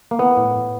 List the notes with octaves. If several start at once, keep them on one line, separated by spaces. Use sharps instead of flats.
A#3
E3 B3
A2
A2